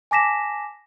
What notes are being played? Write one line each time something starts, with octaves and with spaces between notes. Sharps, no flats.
G#5 A5 D6 A#6 B6 E7